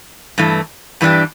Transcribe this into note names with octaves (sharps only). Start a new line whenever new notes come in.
G2 E3 A3
G2 E3 A3 D4 G4